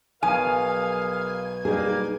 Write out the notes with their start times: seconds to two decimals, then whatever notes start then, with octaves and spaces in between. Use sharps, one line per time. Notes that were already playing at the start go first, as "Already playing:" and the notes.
0.23 B1 G#4 A#4 F5 G#5
1.65 G3 A#3 D#4 G#4